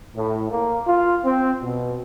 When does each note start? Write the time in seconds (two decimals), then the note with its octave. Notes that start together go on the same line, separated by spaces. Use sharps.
0.15 A2
0.51 A#3
0.87 F4
1.25 C4
1.62 B2